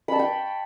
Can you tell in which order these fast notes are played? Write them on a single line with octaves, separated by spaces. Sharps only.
B5 A5 C#6 G5